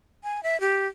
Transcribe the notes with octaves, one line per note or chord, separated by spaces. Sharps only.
G#5
E5
G4